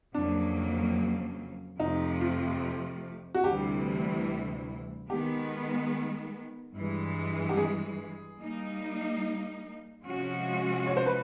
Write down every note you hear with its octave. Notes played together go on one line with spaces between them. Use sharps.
F2 C#3 F#3 A#3 D4
F2 C3 F3 A3 D#4
F4
F#4
D2 C3 E3 G3 G4
D#3 G#3 B3 G4
G2 E3 G#3
G4
G#4
G3 A#3 D#4
C3 F3 G#3 C#4 F#4
C#5
C5
B4